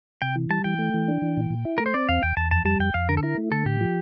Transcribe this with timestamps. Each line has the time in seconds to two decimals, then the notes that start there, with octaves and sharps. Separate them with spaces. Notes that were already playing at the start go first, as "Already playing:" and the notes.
0.22 C3 G5
0.36 E3
0.50 G3 A5
0.64 E3 G5
0.78 A3
0.94 E3
1.08 D4
1.22 E3
1.37 A#2
1.50 A#2
1.65 E4
1.78 A3 A#4
1.86 C5
1.94 C4 D5
2.09 E2 F5
2.23 E2 G5
2.37 E2 A5
2.51 F2 A5
2.65 G3 A5
2.79 F2 G5
2.94 F2 F5
3.09 D3 A#4
3.17 A4
3.23 E4 A#4
3.38 A3
3.51 D3 A4
3.66 A2 G4
3.81 F3